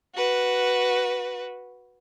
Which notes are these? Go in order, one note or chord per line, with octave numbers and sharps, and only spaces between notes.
F#4 B4